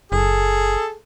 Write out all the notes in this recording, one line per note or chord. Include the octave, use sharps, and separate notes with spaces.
F#1 G#4 A4